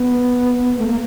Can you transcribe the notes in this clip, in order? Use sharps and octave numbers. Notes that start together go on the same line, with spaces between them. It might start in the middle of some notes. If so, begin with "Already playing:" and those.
Already playing: B3
A3
A#3